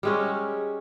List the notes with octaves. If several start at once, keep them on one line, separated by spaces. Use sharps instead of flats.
G3 G#3 C#4